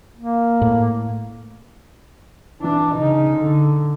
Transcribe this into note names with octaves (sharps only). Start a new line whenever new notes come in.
A#3
A2
E3 D4
C#3 D#4
D3